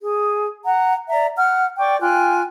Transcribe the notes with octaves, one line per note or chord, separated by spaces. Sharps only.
G#4
F#5 A#5
D5 E5 A#5
F#5 F6
D5 G5 C#6 D6
F4 G5 G#5 F#6